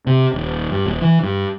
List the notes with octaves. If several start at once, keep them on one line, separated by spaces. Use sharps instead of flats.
C3
D#1
G2
D#1
E3
G2